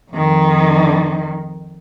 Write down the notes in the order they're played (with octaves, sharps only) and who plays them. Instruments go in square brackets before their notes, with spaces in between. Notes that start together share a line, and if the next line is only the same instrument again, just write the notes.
[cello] F2 D#3